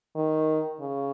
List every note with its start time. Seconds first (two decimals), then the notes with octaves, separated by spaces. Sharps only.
0.15 D#3
0.80 C#3